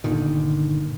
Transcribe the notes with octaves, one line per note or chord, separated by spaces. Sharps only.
G1 A#2 D3 D#3